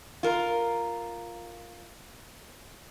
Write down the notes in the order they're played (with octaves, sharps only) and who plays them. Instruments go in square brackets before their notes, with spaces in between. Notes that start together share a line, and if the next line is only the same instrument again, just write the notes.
[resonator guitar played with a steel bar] F4 A#4